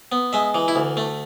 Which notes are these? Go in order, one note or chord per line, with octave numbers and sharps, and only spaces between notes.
B3
G#3 E5
E3
E4
D2
A3